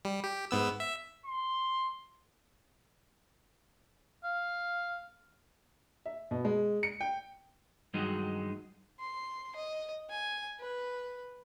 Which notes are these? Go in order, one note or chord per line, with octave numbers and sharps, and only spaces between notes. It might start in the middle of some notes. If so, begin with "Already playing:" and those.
G3
G4
G#2 B3 E6
E5
C6
F5
E5
B2
G#3
C#7
G5
G2 D#3 F#3 G#3 D#4
C6
D#5
G#5
B4